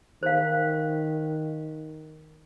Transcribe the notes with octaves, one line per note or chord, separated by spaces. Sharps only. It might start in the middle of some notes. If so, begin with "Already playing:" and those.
D#3 C5 F5